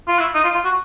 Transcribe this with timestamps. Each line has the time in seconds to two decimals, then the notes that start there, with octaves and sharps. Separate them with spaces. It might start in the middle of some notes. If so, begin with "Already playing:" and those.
0.08 F4
0.19 E4
0.34 D#4
0.44 F4
0.55 F4
0.65 F#4